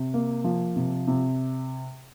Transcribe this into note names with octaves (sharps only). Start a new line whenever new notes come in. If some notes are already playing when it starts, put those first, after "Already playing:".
Already playing: C3
A#3
F3
C3
C3